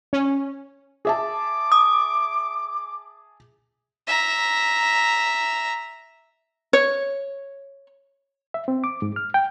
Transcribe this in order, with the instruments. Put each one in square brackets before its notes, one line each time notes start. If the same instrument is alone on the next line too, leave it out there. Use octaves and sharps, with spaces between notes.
[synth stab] C#4
[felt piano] G#4 E5 A5 [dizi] D6
[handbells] D#6
[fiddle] E5 A#5
[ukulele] C#5
[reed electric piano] E5
C4
D6
G#2
F6
G5